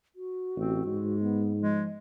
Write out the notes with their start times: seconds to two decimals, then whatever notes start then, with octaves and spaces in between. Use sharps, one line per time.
0.16 F#4
0.56 A1 C4
0.85 G#2 G#3
1.21 B3
1.60 F3 G#3